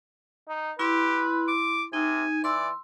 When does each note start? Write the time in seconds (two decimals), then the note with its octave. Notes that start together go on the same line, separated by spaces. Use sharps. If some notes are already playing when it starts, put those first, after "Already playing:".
0.48 D#4
0.79 E4 G4 B4 C6
1.48 D6
1.93 C3 D#4 G#5
2.44 E3 D5 C6 E6